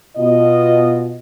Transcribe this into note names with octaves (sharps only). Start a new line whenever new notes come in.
B2 F4 D#5